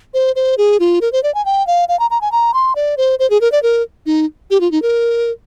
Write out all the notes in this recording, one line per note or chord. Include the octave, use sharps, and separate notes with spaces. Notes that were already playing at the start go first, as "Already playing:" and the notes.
C5
C5
G#4
F4
A#4
C5
D5
G#5
G5
F5
F5
A#5
A#5
G#5
A#5
C6
D5
C5
C5
G#4
A#4
D5
A#4
D#4
G4
F4
D#4
A#4